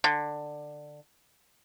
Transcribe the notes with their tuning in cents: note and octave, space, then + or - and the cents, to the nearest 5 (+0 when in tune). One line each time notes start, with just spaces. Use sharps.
D3 +15